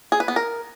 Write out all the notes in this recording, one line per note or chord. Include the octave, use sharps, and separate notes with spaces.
G#4
B4
B3
A#4